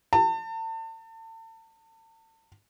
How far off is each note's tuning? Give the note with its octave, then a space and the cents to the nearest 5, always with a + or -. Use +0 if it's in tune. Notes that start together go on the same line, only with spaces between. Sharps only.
A5 +35